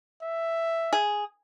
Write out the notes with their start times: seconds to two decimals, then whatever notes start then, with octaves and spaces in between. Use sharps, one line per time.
0.23 E5
0.93 G#4